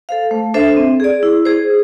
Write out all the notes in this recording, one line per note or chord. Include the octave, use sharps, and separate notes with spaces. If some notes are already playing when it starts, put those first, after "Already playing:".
A4 C5 F5
A3
D4 A4 C5 E5
C4
G#4 D5
E4
G#4 C5